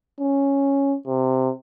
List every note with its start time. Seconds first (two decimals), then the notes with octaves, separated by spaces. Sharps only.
0.20 C#4
1.07 C3